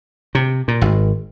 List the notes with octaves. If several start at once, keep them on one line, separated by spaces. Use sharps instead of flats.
C3
A#2
G#1